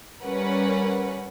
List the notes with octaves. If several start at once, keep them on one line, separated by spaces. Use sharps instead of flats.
G3 C#4 A#4 B4 F#5